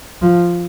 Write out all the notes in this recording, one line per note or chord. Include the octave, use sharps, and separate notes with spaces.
F3